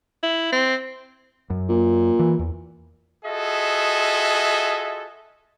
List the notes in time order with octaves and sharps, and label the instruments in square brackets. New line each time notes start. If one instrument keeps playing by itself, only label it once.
[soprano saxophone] E4
C4
[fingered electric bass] F#2
[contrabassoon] A#2
[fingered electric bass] E3
E2
[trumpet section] F4 F#4 G#4 A4 D#5 E5